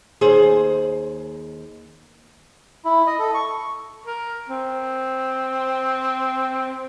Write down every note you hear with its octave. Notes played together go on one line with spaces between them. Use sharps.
D#2 G#4 C5
E4
D#5
A4
C#6
A#4
C4